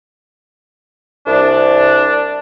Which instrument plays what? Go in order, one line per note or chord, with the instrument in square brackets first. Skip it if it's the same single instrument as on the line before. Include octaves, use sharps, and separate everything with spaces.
[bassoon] C2 [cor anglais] D4